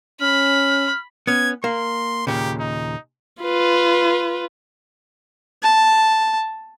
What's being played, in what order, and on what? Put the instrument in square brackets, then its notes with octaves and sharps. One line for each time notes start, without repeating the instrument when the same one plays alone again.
[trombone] C#4 [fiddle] B5 [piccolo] F6
[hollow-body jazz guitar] B3 C#4 [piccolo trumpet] G#6
[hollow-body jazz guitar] A#3 [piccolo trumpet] C6
[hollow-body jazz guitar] D#2 A#2 C#3 [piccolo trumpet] G4
[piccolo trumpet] D#4
[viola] F4 B4
[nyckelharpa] A5